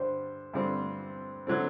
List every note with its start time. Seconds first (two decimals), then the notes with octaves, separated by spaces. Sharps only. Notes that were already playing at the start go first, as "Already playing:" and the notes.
Already playing: G2 D3 G3 C5
0.54 G2 D3 G3 C4
1.47 D3 F#3 A3 C4